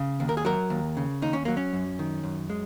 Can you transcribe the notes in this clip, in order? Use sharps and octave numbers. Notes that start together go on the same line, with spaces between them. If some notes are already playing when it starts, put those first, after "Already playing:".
Already playing: C#3
D#2
A#4
G#4
F#3 A#4
D#2
C#3
D#2 D#4
C#4
F#3 A#3
C#4
F#2
D#3
F#2
G#3